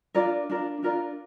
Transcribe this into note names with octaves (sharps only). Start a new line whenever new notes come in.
D4 F4 A#4 D5
D4 F4 A#4 D5
D4 F4 A#4 D5